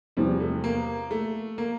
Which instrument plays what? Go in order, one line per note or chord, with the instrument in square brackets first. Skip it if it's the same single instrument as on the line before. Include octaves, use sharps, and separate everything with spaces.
[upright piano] E2 C3 F3 [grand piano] G3
[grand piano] A3
A#3
A3
A#3